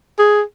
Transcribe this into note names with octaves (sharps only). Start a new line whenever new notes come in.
G#4